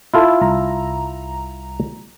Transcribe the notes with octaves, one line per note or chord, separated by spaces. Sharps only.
E4 F4 A4
C2 A#5